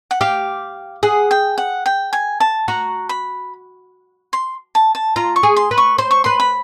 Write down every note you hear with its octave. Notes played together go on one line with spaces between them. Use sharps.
F#5
G4 F5
G#4 F#5
G5
F#5
G5
G#5
A5
F#4 A#5
B5
C6
A5
A5
F4 A#5
C#6
G#4
C6
B4
C#6
C5 C6
C#6
B4 C6
B5